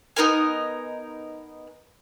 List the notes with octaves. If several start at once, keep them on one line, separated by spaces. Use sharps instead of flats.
B3 D#4 A#4 G#5